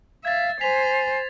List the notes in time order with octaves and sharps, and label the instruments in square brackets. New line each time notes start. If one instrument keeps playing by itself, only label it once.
[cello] E5 [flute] F5 [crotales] G#6 A6
[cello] C5 [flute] G#5 [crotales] B6 F7